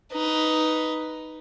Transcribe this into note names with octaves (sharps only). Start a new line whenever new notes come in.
D#4 B4